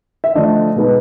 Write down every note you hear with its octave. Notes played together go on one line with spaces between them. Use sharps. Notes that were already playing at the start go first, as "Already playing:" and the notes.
E5
D3 F3 A3 D4 D#5
B2 G#3 B3 D#4